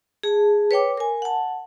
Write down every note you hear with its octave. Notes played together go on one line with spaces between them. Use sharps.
G#4 A5
B4 C#5 G5 D6
A#4 G#5
F#5 A5